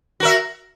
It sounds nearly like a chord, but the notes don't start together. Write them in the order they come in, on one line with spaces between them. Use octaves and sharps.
F#4 A#4 E5